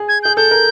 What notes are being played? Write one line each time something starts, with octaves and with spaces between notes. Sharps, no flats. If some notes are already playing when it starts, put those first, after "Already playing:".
Already playing: G#4
G#6
G#4 G6
A4 G6
A#4